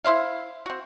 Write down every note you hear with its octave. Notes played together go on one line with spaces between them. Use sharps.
E4 C5 E5 F5
C4 F#4